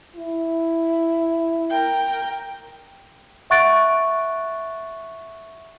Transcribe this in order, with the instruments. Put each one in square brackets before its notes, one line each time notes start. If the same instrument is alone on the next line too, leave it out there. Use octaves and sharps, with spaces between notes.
[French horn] E4
[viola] A#4 G5
[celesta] E5 F#5 C#6 F#6 A6 D7